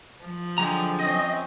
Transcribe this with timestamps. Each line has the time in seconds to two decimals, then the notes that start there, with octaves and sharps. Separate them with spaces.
0.25 F3
0.58 D3 F#3 G#3 G4 A#5
0.99 C4 C#4 D#5